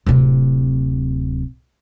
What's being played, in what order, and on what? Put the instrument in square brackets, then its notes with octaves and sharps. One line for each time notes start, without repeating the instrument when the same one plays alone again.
[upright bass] D1 C3